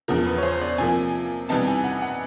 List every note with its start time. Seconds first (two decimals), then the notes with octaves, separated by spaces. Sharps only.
0.08 E2 C#3 F3 A#4
0.26 B4
0.38 C#5
0.43 C5
0.61 D5
0.78 C3 F3 A#3 G#5
1.49 C3 E3 G3 B3 D#4 A5
1.67 G#5
1.84 F#5
2.02 F#5